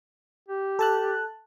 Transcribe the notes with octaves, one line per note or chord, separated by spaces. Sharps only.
G4
A4 A5 F#6